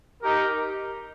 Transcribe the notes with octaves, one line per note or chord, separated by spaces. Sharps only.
D#4 G4 A#4